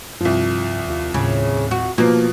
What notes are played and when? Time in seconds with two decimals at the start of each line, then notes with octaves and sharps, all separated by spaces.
0.21 C2 G2 F3
0.87 D#2 F4
1.14 D#2 A2 C#3
1.71 F#4
1.98 B2 F3 A#3